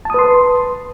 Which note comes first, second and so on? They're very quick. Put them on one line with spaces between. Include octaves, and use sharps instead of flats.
A5 D#6 B4 C6